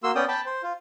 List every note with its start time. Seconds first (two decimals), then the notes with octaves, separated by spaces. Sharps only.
0.03 A#3 F#4 C6 E6
0.15 B3 C#4 D5 G5 D#6
0.28 G5 A5 B5
0.46 C5
0.63 F4